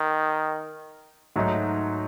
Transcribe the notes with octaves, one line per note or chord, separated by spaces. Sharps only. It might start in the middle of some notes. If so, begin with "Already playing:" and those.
Already playing: D#3
G#2 F#3 A3 D#4 F#4